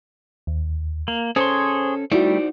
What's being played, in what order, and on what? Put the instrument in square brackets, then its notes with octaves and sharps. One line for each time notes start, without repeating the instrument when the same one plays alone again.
[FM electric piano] D#2
[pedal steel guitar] A#3
[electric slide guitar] C#4 A4 [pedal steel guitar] G#4 C#5 C6 [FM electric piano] C5
[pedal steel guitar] G3 A3 [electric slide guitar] D#4 C5 D5 [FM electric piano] E4 F#4